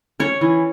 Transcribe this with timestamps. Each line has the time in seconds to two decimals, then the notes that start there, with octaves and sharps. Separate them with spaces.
0.20 C#4 C#5
0.41 E3